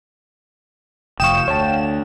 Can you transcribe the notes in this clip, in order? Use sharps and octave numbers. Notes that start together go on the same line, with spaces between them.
F1 F3 F5 G5 C#6 D#6 E7
D2 C#5 A5